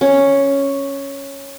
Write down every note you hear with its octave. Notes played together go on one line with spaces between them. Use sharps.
C#4